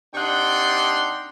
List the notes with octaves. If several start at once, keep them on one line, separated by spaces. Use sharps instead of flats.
C3 D4 D#4 F#5 G5 C6